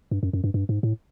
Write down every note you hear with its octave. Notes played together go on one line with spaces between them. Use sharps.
G2
F#2
F#2
G2
G2
G#2
A2